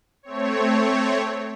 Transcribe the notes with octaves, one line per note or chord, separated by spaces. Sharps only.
A3 C4 C#5